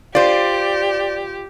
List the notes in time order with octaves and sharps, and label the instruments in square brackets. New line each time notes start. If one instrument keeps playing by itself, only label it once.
[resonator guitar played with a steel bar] F4 C5 [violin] G4 [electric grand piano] D5